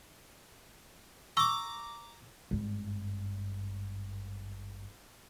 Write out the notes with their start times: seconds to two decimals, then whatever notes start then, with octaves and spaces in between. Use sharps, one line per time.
1.37 A#5 C#6 D6 E6
2.51 G#1 G2